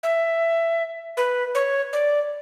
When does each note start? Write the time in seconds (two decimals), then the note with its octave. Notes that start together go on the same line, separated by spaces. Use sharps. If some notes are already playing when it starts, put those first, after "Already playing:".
0.03 E5
1.17 B4
1.55 C#5
1.93 D5